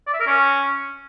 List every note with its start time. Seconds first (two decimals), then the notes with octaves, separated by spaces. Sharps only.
0.07 D5
0.14 E5
0.20 A#4
0.27 C#4